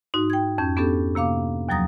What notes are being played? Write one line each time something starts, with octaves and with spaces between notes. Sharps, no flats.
G#2 D#4 F#4
G5 G#6
F2 C#4 G6
B3 C#4 D4 G4 A4
C3 A#3 F5 D6
D#2 F3 F#3 A#5 D#6 A#6